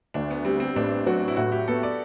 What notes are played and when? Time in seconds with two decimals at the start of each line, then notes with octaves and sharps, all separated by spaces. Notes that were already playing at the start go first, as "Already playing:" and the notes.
0.14 D2 D4
0.30 B3
0.45 G3 C4
0.60 C4
0.76 A1 D4
1.07 F#3 F#4
1.28 E4
1.37 A2 F#4
1.52 G4
1.68 B3 A4
1.83 D5